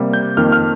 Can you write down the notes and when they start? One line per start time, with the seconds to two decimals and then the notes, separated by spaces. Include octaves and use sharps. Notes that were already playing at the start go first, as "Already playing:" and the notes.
Already playing: C3 G3 A#3
0.13 G6
0.37 F2 D#3 A#3 F6
0.52 F6